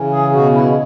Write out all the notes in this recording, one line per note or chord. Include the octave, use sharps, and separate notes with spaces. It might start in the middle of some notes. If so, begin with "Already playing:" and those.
Already playing: C#3 E3
G#4
B2 F#4
E4